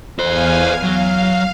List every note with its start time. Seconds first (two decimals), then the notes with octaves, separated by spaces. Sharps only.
0.19 E2 A4 C5 F5 G#5
0.83 F#3 F5